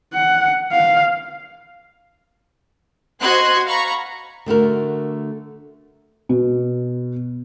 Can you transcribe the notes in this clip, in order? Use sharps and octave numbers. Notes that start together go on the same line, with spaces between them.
F#5
F5
F#4 C5 D#5 C6 F#6 G#6
F5 A#5 B5 C#6
D3 A3 F#4 A#4
B2